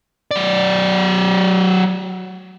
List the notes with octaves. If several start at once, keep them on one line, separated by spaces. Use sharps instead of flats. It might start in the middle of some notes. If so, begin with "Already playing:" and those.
F#3 D5